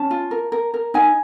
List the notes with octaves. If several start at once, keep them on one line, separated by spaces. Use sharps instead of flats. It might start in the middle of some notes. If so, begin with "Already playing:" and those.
Already playing: C#4 A5
F4
A#4
A#4
A#4
D#4 G#5